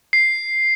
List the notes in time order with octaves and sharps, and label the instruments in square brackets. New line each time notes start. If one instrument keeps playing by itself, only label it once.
[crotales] C7